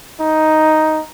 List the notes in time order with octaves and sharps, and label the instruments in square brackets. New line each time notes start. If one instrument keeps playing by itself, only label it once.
[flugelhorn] D#4